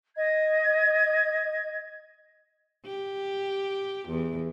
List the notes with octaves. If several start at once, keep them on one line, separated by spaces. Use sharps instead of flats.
D#5 G#6
G4
E2